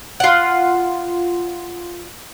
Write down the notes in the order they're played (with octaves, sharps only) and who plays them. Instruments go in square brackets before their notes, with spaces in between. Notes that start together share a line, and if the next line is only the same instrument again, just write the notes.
[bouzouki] F4 F#5